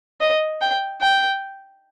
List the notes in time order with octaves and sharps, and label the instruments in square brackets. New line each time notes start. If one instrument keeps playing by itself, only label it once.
[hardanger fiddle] D#5
G5
G5